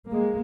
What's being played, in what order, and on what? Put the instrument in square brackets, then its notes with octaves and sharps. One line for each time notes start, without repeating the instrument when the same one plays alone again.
[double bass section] G#3 A#3